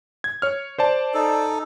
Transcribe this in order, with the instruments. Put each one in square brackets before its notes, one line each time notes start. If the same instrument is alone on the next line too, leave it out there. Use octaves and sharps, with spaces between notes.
[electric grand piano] G#6
C#5 F6
C5 D5 A5
[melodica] D#4 A4